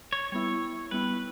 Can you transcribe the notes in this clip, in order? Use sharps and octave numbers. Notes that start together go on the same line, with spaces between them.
C#5
G3 B3 E4 C#5
G3 B3 E4 B4